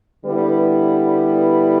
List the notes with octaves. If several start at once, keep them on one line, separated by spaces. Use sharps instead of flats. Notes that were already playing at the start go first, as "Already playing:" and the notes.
D3 G3 B3 E4 B4